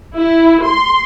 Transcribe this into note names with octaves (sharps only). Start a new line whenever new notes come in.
E4
C6